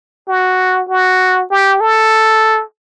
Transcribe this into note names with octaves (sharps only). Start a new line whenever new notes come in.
F#4
F#4
G4
A4